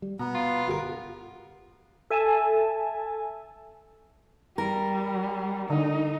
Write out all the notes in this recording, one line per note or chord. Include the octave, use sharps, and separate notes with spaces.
G3
B2 B3 A#5
F4
G1 F4 G4 A#4
A4 E5 G#5 A5
G3 A#4
D3 D#4